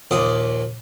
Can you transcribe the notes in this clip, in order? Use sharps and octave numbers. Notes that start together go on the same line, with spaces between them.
A#1 D#2 D4 D#6